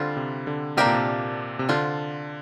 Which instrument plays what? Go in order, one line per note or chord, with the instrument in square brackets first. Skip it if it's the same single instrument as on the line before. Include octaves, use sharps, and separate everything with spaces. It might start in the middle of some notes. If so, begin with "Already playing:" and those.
Already playing: [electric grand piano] D3 [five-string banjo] G3 C4 F4 C5
[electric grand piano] C3
D3
[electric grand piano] C3 [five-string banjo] A#3 D4 G4 A#4
[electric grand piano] A#2
C3
C3
[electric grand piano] D3 [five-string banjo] D4 F4 C5